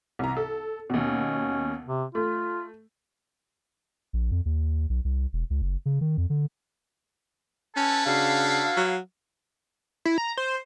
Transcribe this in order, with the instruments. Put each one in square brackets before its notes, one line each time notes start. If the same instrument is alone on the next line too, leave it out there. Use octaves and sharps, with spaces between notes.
[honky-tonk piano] C2 A#5
A4
[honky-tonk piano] D#2 B2 [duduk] C#4
[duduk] C3
[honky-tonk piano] A3 [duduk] F4
[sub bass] A#1
F2
D#2
B1
C2
E1
C#2
F#1
C#3
D#3
F2
D3
[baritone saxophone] C#4 [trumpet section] E4 A4 B4 [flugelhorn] A5
[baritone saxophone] C#3 [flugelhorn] D4 [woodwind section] F#4 F5
[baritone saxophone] F#3
[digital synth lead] E4
A#5
C5